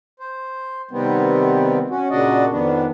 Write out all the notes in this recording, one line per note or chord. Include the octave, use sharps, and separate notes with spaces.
C5
C3 D#3 G3 B3 C4
C#4 F#4
A#2 C#3 D4 F#4 D5 D#5
F2 D#3 B3 D4